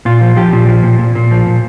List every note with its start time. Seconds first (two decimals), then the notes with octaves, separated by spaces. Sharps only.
0.05 A#2 F4
0.21 F3
0.36 F3 G4
0.52 A#2
0.67 F3
0.83 A#2
0.99 A#2
1.15 A#2
1.31 F3
1.46 A#2